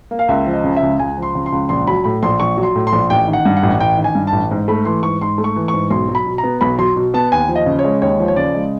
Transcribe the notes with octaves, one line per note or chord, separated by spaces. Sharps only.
A#3
F5
C#2 E5
F3
D#5
C#3
E5
C#2
C#2 G#5
F3
C6
C#3
C6
C#2
A#1 C6
F#3 B5
A2 B5
A#1 C6
A#1 C#6
F#3
C6
A2
C6
A#1
A1 G5
D#3
F#5
G2
F#5
A1
A1 G5
D#3
G#5
G2
A5
A1
G#2
A3 B5
E3 C6
G#2 C#6
G#2 C6
A3
C#6
E3
C#6
G#2
B1 C6
F#3
B5
B2
A#5
B3
B1 B5
F#3 C6
B2
B3 A5
D#2 G#5
F3
D#5
C#3
C#5
G#3
D#2 C#5
F3
C#5
C#3 D5
G#3